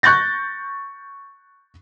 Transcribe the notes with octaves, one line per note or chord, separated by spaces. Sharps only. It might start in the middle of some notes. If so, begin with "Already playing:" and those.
C#6 F#6 G6 A6 A#6